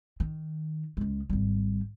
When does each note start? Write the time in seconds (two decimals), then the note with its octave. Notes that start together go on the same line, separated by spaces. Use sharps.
0.20 D#3
0.97 C#2 G#3
1.29 G#1 G3